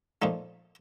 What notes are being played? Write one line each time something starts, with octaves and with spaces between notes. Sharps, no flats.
A#2 F3 A3 D#4